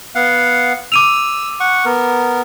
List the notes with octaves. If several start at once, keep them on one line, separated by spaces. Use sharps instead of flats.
B3 F5 F#5
D6 E6 D#7 F7
F#5 C#6
B3 A#4